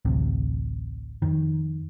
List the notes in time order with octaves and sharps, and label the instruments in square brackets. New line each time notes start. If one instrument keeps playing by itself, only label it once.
[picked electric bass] A1 D2 C3
F2 D#3